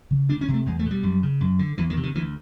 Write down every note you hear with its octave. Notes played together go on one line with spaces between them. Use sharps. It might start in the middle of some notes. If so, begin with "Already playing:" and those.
C#3
D2 D4
C#4
C3
A3
E2 G#3
A3
B2
G3
F#2
C#3
F#2
D3
E2 E3
D#3
C3
D#3
D2 E3